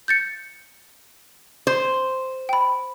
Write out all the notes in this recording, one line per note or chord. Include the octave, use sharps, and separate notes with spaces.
G6 A6 C#7
C5
G5 B5